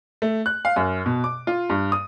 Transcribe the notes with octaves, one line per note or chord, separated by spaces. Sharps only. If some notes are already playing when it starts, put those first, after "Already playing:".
A3
F#6
F5
F#2
B2
D6
F4
G2
D#6